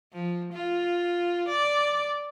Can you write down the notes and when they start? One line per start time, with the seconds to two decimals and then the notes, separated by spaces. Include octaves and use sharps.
0.13 F3
0.53 F4
1.48 D5